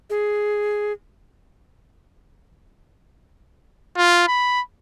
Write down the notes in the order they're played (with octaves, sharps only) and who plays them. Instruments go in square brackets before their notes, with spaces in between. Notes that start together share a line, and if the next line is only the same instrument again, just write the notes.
[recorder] G#4
[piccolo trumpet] F4
B5